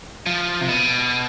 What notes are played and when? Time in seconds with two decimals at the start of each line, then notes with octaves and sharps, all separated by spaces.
0.26 F3
0.61 C3
0.69 B2